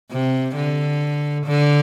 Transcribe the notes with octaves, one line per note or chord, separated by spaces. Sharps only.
C3
D3
D3